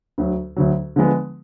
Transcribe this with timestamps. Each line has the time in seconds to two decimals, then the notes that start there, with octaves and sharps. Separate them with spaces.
0.18 D2 D3 F#3
0.56 D2 D3 F#3
0.96 D3 F3 G#3 B3